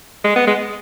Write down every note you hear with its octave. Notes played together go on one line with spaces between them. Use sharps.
G#3
B3
G#3